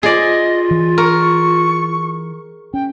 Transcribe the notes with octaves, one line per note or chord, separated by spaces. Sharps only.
F4 G#4 D5 D#5
E3
A#4 C#6
C#4 G5